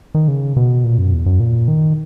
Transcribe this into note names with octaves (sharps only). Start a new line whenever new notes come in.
D#3
C#3
B2
A#2
F#2
E2
F#2
A#2
D#3